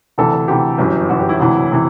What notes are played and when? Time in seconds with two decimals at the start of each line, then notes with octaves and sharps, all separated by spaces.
0.18 D2 C3 E3 A4
0.33 A4
0.48 D2 C3 E3 G4
0.78 G1 F#2 E3
1.09 G1 F#2 E3 F#4
1.20 G4
1.29 E4
1.39 E1 D2 C3 E3
1.72 C3 E3